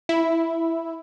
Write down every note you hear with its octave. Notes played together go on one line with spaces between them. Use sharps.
E4